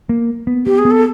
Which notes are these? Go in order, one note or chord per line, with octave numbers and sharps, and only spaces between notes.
A#3
B3
B3 G4
G#4
B3
A4